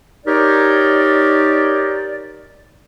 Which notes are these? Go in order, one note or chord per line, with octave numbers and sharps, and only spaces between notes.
D#4 G4 A#4 C#5 D5